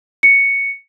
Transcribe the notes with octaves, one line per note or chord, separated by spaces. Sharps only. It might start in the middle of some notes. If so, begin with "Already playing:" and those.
C#7